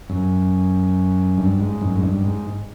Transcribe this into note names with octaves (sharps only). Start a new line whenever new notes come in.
F#2
G2
G#2
F#2
G#2
G2
G#2